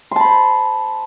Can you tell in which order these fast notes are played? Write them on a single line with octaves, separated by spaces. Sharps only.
C6 A5 B5 C5